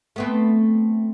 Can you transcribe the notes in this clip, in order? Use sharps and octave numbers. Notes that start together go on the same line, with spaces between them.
A3 B3 C4